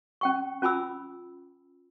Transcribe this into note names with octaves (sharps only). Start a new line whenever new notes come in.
C#4 G5 C#6
C#4 F4 G#5 B5 D6 E6